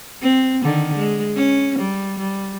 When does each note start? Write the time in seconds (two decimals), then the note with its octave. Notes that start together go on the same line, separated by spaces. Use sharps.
0.22 C4
0.63 D3 D#3
0.97 G#3
1.36 C#4
1.79 G3
2.19 G3